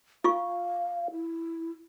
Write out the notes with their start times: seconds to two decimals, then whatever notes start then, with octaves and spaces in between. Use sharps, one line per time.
0.24 F4 F5 C#6
1.12 E4